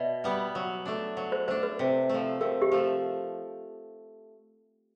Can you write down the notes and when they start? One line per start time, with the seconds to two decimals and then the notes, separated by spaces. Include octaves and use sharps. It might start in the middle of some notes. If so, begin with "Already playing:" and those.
Already playing: B2 D5 E5
0.24 G3 B3
0.55 F#3
0.85 A3 D4
1.17 F#3
1.32 C5
1.48 A3 D4 C5
1.63 B4
1.79 C3
2.09 F3 A3
2.41 C3 A#4
2.62 G4
2.72 F3 A3